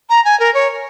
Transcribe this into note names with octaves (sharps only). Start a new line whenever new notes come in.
A#5
G#5
A#4
C#5